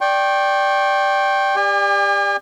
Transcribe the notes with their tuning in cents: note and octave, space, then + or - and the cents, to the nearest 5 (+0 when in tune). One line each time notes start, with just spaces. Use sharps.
D5 +0 G5 +0 C#6 -40
G4 +30 D5 +10 G#5 -45